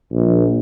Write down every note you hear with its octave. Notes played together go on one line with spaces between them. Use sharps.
A#1